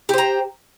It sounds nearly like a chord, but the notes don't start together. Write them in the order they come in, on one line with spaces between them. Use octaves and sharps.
G4 C5 A#5